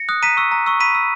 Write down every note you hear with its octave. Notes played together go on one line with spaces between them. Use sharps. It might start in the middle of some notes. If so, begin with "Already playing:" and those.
Already playing: A#6 C#7
D#6 F#6
A#5 B6 D#7
C#6 E6
A#5
C#6 E6
B5 B6 D#7
E6